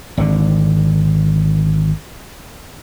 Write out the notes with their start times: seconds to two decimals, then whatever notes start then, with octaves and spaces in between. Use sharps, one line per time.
0.17 G#1 D3